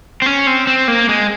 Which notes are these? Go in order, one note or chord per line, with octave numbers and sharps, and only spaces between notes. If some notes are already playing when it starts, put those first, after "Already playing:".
C4
C#4
C4
C4
A#3
G#3